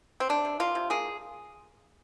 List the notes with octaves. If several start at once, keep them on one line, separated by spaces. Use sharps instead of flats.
C4
C3 D4
C3
A#3 F4
C3
A#3 G#4